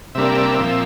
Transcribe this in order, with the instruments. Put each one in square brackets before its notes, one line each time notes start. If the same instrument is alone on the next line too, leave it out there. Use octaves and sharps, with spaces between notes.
[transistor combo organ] C3 G3 A#3 D4 E5
A#2 F3 C4